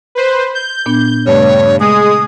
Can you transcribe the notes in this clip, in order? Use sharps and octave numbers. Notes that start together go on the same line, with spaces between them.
B4 C5
G6
A#2 B3 D4
G2 C#3 A3 C#5
G#3 G#4 D#6